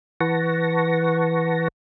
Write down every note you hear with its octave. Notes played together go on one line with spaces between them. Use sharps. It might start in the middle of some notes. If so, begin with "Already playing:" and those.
E3 B4 F#5 A5 C#6 A#6